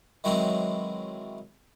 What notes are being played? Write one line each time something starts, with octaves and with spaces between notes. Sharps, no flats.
D#3 E3 F#3 G#3 C4